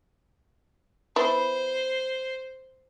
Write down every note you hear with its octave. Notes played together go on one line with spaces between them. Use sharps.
B3 E4 B4 C5